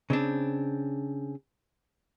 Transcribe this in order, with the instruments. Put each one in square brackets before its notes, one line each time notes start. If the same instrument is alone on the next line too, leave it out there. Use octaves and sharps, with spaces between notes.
[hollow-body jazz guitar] C#3 C4 D4